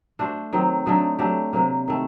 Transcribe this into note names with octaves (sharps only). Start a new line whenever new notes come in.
A3 D4 F#4 C5
D#3 F#3 C4
D3 F#3 A3 D#4
F#3 A3 D4 G4
C3 F#3 A#3
D#3 A3